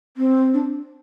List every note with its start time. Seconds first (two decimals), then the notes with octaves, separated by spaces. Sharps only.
0.17 C4
0.54 D4